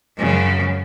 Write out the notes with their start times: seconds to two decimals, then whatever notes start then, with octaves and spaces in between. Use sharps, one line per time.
0.17 F#2 C#3